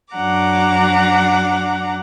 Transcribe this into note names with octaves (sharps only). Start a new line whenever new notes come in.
F#2 D4 F#5 A#5 D6